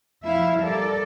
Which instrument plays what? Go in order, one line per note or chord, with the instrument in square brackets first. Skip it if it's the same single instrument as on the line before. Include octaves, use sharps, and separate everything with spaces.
[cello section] F2 E4 E5 F5
G3 A4 A#4 D5